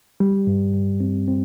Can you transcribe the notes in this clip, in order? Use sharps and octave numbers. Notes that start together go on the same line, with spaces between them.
G3
G2
G2
C4
C4